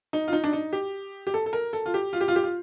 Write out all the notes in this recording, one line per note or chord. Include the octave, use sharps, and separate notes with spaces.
D#4
F4
D#4
D4
D#4
G4
G4
A4
A4
A#4
A4
F4
G4
F4
G4
F4
G4
F4